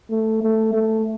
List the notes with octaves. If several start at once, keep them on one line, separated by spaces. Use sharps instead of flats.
A3
A3
A3